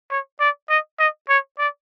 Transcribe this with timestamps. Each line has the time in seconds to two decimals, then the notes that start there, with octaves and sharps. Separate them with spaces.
0.10 C#5
0.40 D5
0.69 D#5
0.99 D#5
1.29 C#5
1.58 D5